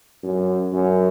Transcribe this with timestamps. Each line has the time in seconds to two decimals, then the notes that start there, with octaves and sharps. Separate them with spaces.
0.23 F#2
0.73 F#2